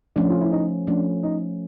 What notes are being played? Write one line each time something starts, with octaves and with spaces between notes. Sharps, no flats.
F3 A3 C#4 D4
F4
E4
D#4
F3 A3 C#4 D4
D#4